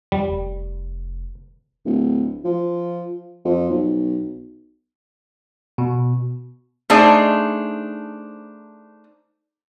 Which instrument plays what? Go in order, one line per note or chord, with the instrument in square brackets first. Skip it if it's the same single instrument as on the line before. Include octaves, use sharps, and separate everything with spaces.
[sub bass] E2 [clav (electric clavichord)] G3
[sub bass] F1
[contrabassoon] D1
F3
F2
B1
[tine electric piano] B2
[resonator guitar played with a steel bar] A3 D4 D#4 G#4 C5